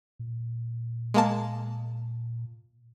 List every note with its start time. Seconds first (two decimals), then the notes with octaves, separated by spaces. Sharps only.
0.19 A#2
1.14 G#3 A#3 A5